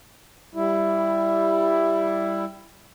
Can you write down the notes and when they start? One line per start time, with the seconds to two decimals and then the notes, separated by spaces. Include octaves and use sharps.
0.55 G3 E4